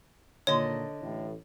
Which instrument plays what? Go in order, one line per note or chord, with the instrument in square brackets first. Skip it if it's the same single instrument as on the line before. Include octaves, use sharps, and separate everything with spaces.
[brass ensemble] A#2 D#3 [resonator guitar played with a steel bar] D3 D#5 [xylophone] C#5
[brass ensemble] A1 A2